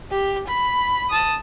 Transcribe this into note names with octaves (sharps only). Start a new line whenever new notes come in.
G4
B5
A5 D#6